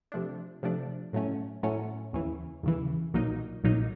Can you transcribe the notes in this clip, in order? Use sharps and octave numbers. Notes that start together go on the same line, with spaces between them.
C3 F3 A3 D4
C3 F3 A3 D4
A2 F#3 A3 C#4
A2 F#3 A3 C#4
D#2 C#3 E3
D#2 C#3 E3
B1 A#2 F#3 A#3 D#4
B1 A#2 F#3 A#3 D#4